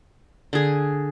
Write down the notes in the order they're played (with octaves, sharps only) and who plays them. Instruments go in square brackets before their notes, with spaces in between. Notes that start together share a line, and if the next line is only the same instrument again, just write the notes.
[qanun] D3 G#4